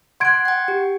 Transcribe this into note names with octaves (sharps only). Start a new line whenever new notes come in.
F#5 C6 F#6 G#6 D7
F#5 G5
G4